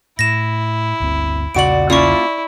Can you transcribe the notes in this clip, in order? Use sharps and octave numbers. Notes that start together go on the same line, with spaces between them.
A2 E4 A#6 E7
G1 D2 C4
B1 E2 A#2 C#3 F#4 D5 D7 F#7
A#3 C#4 E4 F4 D5 C#6